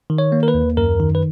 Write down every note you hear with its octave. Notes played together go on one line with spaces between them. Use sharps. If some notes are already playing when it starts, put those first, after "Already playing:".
D#3
C#5
A#3
A#4
B4
D#2
F#2 A#4
D#3
B4